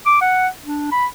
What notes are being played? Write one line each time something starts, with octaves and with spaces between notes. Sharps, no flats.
D6
F#5
D4
B5